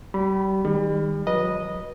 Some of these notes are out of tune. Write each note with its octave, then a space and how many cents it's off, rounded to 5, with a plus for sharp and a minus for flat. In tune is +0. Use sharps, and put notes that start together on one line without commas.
G3 -30 B5 -5
D#3 +0 G3 +40
F#3 -35 B4 -25 D#5 -5